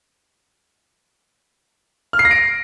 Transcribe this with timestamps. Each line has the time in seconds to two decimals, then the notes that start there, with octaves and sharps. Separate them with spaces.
2.13 F6
2.19 C7
2.25 A#6
2.31 D7